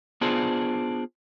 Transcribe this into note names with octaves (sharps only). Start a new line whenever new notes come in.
B3 D4 F4 G#4 C5